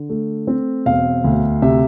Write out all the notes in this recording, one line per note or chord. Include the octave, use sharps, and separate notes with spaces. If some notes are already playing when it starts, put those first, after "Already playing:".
Already playing: D3
A3
C4
E1 F5
D2
C3 E5